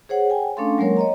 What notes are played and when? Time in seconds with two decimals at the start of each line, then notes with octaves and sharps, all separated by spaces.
0.09 G#4 C5 C#5 F#5
0.30 G5 G#5
0.57 A3 C#4 D4 A4 F5 C6
0.78 F#3 G#3 A#3 A#4 C#5
0.97 C#5 D#5 A#5